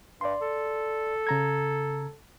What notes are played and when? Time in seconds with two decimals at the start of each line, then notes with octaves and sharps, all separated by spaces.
0.21 G2 D5 C6
0.41 A4
1.27 C#3 A#5 G#6